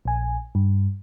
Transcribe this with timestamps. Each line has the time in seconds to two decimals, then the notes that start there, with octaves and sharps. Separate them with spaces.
0.05 A#1 G#5
0.55 G2